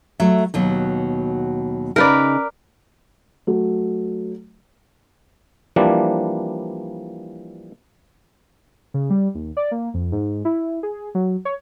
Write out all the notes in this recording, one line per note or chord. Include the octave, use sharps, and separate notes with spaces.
F#3 A3 E5
D#2 B2 F#3
C#3 D#4 A#4 B4 D5
F#3 A3
E3 F3 G3 A#3 D4
C#3
G3
D#2
D5
A#3
F2
G#2
E4
G#4
F#3
C#5